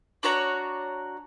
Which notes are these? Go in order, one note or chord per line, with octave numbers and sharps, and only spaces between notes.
D4 F#4 C#5 A#5